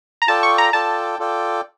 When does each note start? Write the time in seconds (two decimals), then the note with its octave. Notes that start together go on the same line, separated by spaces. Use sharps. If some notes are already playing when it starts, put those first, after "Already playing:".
0.22 A#5
0.28 F4 A4 D5 G5 A5
0.43 C#6
0.58 A#5
0.73 F4 A4 D5 G5 A5
1.19 F4 A4 D5 G5